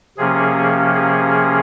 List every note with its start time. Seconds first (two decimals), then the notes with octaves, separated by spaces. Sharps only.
0.18 C3 F3 A#3 C#4 G#4
0.94 G#4